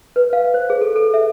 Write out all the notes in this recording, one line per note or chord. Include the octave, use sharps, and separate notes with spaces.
B4
F5
C5
G#4
A4
A4
E5